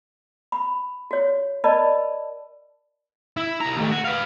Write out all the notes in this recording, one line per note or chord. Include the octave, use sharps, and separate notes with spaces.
B5
F#4 C#5
A#4 D5 D#5 A5 B5
E4
C2 A#5
D#2 A3
F#4
B4 F5